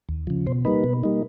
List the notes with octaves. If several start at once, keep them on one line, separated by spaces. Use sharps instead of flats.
D#2
C#3 F3
B2 C5
G3 A#3 D#4 B4
B2
G3 A#3 D#4